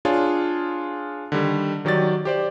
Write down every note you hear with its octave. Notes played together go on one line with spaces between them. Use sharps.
D4 F4 G#4 C#5 G#5
D3 D#3 G3
D#3 F#3 G4 D5 A6
G4 C5 D5